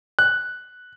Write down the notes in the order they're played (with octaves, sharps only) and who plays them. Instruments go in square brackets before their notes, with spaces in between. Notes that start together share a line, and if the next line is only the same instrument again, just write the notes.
[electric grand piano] F#6